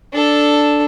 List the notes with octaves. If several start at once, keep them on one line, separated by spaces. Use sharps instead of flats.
D4 A4